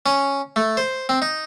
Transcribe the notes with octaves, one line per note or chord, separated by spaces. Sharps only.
C#4
A3
C5
C4
D#4